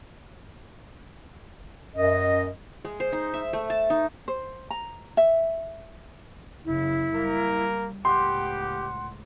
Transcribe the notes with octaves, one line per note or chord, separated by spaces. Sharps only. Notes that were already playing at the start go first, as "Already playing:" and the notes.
F#2 D#5
G#3
C5
D#4
E5
A3
A5
D#4
C5
A#5
E5
F#1 C#3 E4
G3 A#3 A#4
C#2 A2 B3 G4 F#5 C6